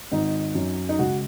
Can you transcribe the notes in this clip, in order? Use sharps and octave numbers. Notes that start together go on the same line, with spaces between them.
G#1 D#4
F#2 F#3
D#4
C#2 F#4